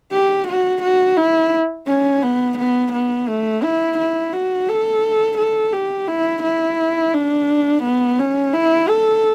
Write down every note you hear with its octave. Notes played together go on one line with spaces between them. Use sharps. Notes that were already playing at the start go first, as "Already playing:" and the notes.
G4
F#4
F#4
E4
C#4
B3
B3
B3
A3
E4
E4
F#4
A4
A4
G4
E4
E4
D4
B3
C#4
E4
A4